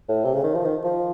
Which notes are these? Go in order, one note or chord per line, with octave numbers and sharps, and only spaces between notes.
A2
C3
C#3
D#3
F3
D#3
F3